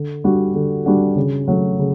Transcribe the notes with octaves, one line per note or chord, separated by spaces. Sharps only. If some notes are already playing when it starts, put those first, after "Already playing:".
Already playing: D3
G3 D4 F#4
D3
G3 D4 F#4
C#3
F#3 A3
C#3